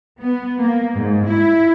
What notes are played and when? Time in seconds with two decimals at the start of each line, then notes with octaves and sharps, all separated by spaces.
0.23 B3
0.61 A#3
0.98 G#2
1.28 E4